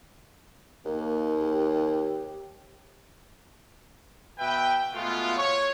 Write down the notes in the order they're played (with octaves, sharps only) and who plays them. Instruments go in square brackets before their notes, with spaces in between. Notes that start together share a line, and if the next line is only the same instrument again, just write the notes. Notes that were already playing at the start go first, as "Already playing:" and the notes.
[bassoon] D#2 [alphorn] A#3
[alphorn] G4
[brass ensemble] B2 B4 E5 G5
B2 G#3 A3 B3 F4
C#5